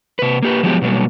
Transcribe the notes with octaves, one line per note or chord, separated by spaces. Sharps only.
C3 B4
A#3 G4 B4
F3 F#3 G#3 B3 E4 G4
B2 D3 F#3 G3 A#3